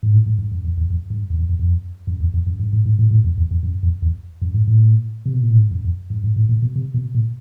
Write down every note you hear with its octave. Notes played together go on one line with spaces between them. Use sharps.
G#2
A2
G#2
G2
F#2
F2
E2
F2
G2
E2
F2
F2
F2
F#2
E2
F2
F#2
G2
G#2
G#2
A2
A2
F2
E2
F2
F#2
F2
E2
F#2
G#2
A2
C3
B2
A#2
A2
G#2
F#2
F2
G2
G#2
A2
A#2
B2
C3
B2
A#2